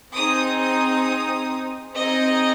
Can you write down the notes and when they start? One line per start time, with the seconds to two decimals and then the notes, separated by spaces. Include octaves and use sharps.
0.15 C4 D#4 G#4 D#6
0.60 D#6
1.96 C4 D#4 G#4 D#5